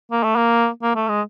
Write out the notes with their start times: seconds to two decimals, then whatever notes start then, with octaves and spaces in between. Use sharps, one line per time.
0.11 A#3
0.23 A3
0.36 A#3
0.82 A#3
0.95 A3
1.08 G#3